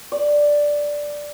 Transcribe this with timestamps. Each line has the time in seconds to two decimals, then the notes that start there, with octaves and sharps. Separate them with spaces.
0.12 D5